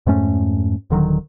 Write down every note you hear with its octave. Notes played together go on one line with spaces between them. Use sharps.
F2 G#2 A3 C#4
D#1 D3 D#3 F#3